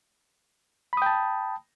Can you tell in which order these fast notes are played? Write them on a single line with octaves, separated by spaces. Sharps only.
B5 D#6 G5 A5